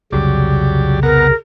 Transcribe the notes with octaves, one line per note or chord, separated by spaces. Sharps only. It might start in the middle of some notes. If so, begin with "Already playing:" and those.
C2 F2 C#3 F#3 G4 D5
B3 A#4 F#5 A#5